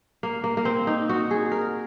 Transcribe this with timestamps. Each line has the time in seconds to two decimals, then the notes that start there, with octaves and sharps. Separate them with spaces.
0.23 A#3
0.44 A#3
0.57 A#3
0.65 C4
0.87 D#4
1.09 F#4
1.31 G#4
1.52 A#4